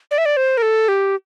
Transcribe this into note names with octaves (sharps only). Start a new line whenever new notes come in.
D5
E5
D5
C5
A#4
A4
G4